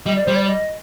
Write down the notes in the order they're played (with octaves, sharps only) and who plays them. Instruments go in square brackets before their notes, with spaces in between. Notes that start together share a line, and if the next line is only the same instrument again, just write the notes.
[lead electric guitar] G3 [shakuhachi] D#5
[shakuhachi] D5
[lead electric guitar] G3 [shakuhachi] C5
[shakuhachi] D5
D#5